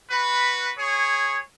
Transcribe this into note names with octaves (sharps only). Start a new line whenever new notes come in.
F#4 B4
G#4 C#5